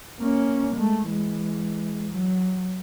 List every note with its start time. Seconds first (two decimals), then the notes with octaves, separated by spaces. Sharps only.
0.18 A#3 C#4
0.75 G#3 A3
1.08 E3 G#3
2.11 F#3